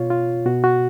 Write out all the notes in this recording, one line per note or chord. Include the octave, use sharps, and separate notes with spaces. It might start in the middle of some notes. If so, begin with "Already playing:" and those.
Already playing: B2 F4 C#5
F4
B2 F#4
F#4